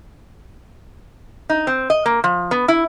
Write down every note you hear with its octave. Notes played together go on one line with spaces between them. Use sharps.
D#4
C4
D#5
A#3
F3
B3
E4